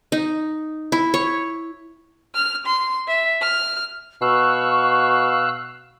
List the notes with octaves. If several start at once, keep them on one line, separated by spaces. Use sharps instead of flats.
D#4
E4
C#5
F6
C6
E5
F6
B2 F5 C#6 E6 F#6